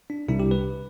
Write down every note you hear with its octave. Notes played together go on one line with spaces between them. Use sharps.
D4
C2 C3 G3 D4 E4
G4
B4